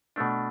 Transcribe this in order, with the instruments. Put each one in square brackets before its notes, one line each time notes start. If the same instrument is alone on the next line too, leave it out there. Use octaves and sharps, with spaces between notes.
[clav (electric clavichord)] B2 A3 D4